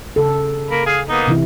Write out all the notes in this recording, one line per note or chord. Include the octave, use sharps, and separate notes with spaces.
C#3 A4
A#3 A#4 B5
G#4 F5
A#3 B3 D#4
C3 E3 E4